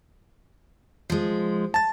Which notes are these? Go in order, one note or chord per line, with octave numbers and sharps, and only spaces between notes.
F3 G#3
A5 A6